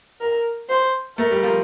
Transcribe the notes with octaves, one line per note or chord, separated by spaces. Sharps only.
A#4
C5
A3 A#4
G3
F3